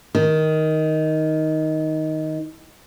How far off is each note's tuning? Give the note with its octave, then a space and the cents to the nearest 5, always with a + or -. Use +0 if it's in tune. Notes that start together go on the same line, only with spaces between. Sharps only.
D#3 +10